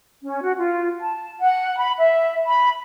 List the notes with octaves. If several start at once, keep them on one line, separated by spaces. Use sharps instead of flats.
C#4
F#4
F4
A5
F#5
B5
E5
B5